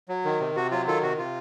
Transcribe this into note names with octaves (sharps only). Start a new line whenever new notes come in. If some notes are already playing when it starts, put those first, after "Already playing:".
F#3
D#3
C3
C3 F#4
F#3 F4
D#3 F4 A4
C3 F#4
C3 F4